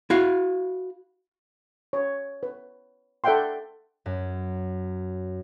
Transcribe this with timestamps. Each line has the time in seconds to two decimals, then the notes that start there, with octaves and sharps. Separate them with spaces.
0.10 E4 F#4 F5
1.93 C#5
2.43 B4
3.24 A4 D5 E5 F#5 G5 C6
4.06 F#2